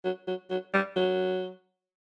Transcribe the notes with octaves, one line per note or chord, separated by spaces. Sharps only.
F#3
F#3
F#3
G3
F#3